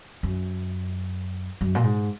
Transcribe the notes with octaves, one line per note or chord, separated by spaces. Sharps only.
F#2
F#2
A#2
G#2